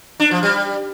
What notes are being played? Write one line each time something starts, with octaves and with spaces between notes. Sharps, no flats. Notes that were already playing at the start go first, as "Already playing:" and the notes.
D4
F3
G3